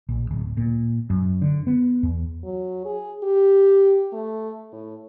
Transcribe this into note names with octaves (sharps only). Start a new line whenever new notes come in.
A#1
D1
A#2
F#2
D3
B3
E2
F#3
G#4
G4
A3
A2